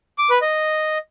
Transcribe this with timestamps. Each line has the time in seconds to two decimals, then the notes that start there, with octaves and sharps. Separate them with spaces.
0.18 D6
0.30 B4
0.42 D#5